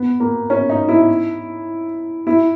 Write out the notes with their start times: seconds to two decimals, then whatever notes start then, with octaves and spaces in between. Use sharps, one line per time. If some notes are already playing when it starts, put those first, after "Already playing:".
Already playing: B3
0.20 A#3
0.50 C#4
0.70 D#4
0.89 E4
2.27 E4